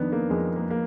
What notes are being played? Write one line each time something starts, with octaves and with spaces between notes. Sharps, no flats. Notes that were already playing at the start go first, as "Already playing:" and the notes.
Already playing: F2 D#3 B3 D4 D#4
A#3
F2 G#3
A#3
A#3